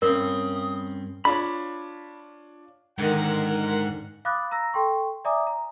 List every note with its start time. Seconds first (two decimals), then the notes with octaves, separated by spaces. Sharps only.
0.02 G2 C4 C#4 A#4 D#6
1.25 D4 F4 C#5 B5
2.98 G#2 D3 D#3 A#4 F#5
4.25 F5 B5 D6 D#6 F#6 A6
4.51 A#5 E6 A#6
4.73 A4 G5 C6 C#6
5.25 D5 E5 G#5 A#5 D6 D#6
5.47 A#5